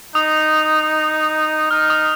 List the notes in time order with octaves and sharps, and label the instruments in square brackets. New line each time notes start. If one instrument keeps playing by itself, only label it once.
[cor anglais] D#4 [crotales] D#6
[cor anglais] D#4 [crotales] F6
[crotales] D#6